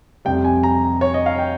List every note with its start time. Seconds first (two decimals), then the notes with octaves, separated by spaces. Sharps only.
0.25 F2 C3 G3 G5
0.44 G#5
0.63 A#5
1.01 C#5
1.14 D#5
1.26 F5
1.39 G5